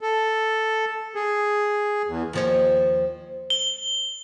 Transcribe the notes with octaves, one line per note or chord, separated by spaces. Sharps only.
A4
G#4
E2
D#2 F3 C#5
G7